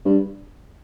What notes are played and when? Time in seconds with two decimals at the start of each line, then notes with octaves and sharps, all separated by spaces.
0.05 G2